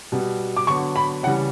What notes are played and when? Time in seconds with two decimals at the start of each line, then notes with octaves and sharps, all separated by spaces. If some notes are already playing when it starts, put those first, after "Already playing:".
0.12 B2 G3 B3
0.57 D6
0.67 D3 F#3 B3 C#6
0.96 B5
1.23 C#3 E3 G3 F#5